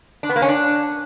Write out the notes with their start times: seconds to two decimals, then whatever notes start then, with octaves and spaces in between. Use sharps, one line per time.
0.23 D4
0.29 B3
0.36 A#3
0.42 C#4
0.48 D4